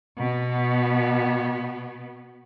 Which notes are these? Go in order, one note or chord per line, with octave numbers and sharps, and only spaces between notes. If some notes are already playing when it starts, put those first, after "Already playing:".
B2 B3